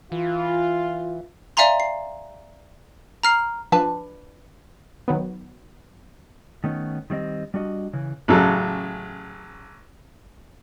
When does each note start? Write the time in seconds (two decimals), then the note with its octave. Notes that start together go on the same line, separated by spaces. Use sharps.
0.12 E3 F4
1.57 D5 E5 F5 G#5 A#5 C6
1.80 C7
3.23 A#5 F6 C7
3.72 F3 D4 B4 A5
5.08 D#3 F#3 B3
6.64 D#3 A3 B3 C#4 D#4
7.10 D#3 G3 C4 D#5
7.54 G3 D4 F#4 D#5
7.93 C#3 E3
8.28 A1 C#3 F#3 A4